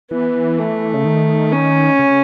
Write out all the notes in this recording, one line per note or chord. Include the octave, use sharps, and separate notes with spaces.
E3 B3
A3
C#3
D#3
C#4
C#3